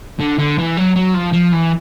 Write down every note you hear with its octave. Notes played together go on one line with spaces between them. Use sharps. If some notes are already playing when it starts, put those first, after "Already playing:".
D3
D3
E3
F#3
F#3
F3
F3
E3